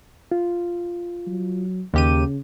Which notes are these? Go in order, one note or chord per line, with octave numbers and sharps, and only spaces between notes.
F4
F#3
D#2 C#3 G4 D#7